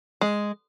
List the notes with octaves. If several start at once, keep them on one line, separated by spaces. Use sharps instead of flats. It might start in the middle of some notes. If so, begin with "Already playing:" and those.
G#3